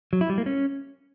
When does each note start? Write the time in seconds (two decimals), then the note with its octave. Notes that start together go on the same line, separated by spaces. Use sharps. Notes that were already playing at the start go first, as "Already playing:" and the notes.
0.13 F#3
0.21 E4
0.29 G3
0.38 A#3
0.46 C#4